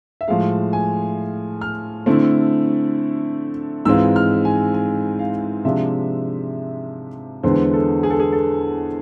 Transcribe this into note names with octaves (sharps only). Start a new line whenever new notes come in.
E5
A2 F3 G#3 F5
G#5
F6
D3 A3 C4 E4
G#2 E3 G#3 C4 F4 E6
F6
G#5
G#5
F5
C3 F3 G#3 D4 E5
E2 D3 G#3 B3 C5
A4
G#4
A4
G#4
A4